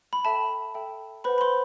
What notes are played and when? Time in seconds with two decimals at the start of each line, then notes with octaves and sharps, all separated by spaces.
0.13 B5
0.25 A4 E5 G5 A5
0.74 A4 E5 G5
1.24 B4 C5 F#5 B5
1.38 B5
1.41 C5 C6